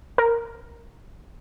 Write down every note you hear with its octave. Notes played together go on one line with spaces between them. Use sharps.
A#4